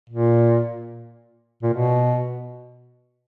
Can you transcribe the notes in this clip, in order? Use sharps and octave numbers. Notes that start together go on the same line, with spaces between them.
A#2
A#2
B2